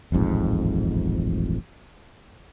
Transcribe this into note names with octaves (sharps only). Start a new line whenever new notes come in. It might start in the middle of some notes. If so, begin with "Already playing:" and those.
D#1 A1 F2 G#2